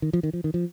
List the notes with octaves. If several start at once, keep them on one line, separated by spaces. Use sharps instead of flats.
D#3
F3
D#3
F3
D#3
F3